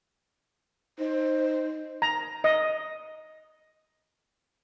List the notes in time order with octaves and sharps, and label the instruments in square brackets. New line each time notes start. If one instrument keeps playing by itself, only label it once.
[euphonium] D#4 [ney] C5
[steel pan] A#5
D#5